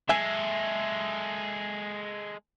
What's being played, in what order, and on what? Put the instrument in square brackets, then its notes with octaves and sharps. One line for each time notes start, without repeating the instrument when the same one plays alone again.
[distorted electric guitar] G#3 A4 [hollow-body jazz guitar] E5 G#5